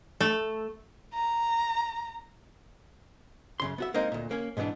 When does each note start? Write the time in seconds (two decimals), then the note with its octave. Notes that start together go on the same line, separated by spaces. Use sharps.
0.20 A3
1.14 A#5
3.60 F#2 C#3 C6
3.78 B3 F#4 E5
3.94 G#3 A#3 C4 D#4
4.12 D2 A#2
4.31 A#3 C#4
4.57 G#2 B2 E3 B3 D4